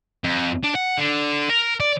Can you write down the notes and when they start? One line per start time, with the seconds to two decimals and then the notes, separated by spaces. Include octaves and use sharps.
0.24 F2
0.63 D4
0.75 F#5
0.98 D3
1.49 A#4
1.80 D5